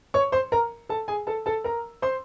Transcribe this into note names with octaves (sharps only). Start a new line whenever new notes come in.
C#5 C#6
C5 C6
A#4 A#5
A4 A5
G#4 G#5
A4 A5
A4 A5
A#4 A#5
C5 C6